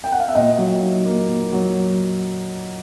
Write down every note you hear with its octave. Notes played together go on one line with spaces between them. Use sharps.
G5
F#5
F5
E5
A#2 D#5
F#3
D#4
A#3
A#2
F#3